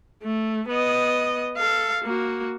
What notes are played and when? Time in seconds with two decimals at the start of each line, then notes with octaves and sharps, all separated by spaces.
0.23 A3
0.69 B3 D#5
1.57 A4 F5
2.04 A#3 F#4